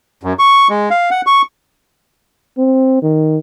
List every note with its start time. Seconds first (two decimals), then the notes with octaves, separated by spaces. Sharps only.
0.23 F#2
0.39 C#6
0.70 G#3
0.90 F5
1.11 F#5
1.27 C#6
2.58 C4
3.02 D#3